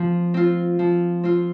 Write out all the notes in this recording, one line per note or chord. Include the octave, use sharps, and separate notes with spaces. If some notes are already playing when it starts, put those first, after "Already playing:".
Already playing: F3 C4 F4
C4 F4
F3
C4 F4